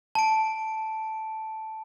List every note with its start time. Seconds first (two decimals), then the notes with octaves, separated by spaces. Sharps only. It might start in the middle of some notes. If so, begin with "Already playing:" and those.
0.15 A5 D7